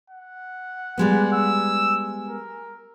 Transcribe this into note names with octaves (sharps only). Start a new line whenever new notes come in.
F#5
G3 G#3 B3
E6
A#4